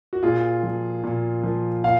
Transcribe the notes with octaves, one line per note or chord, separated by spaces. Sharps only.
F#4
A#2 F4 G#4
F3
A#2
F3
A#2 F5